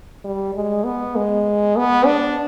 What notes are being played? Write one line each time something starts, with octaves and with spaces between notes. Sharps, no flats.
G3
G#3
B3
G#3
B3
D4